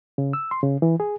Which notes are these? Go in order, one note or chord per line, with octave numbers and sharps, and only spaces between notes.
C#3
E6
C6
C#3
E3
G#4